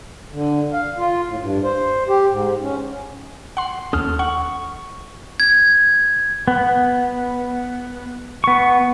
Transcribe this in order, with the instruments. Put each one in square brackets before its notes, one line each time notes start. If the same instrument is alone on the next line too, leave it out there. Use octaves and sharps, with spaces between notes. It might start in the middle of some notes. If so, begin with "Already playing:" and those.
[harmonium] D3
F5
F4
A2
G2
C5
G4
G#2
C#4
[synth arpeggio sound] F#5 C6
[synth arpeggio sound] D#2 C#4 [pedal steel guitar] A4 D#6 F6
[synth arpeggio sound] F#5 [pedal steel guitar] C#6
[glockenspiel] G#6
[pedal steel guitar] B3
B3 C#6